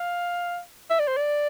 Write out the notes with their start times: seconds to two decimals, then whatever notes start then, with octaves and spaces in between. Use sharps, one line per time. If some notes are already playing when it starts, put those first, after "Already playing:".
Already playing: F5
0.91 E5
1.00 D5
1.08 C5
1.17 D5